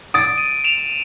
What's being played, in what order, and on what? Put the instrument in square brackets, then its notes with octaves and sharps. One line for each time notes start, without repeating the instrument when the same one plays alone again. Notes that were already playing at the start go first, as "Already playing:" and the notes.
[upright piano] D#6 A6 [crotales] D7
[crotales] D#7
D7 E7 F7